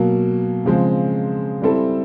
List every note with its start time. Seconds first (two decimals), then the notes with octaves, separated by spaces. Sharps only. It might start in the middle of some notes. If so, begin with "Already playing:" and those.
Already playing: B2 F#3 A#3
0.65 C#3 F3 G#3 C4
1.62 G3 C4 E4 A4